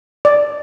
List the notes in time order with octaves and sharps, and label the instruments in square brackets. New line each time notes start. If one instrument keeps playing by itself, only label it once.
[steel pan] D5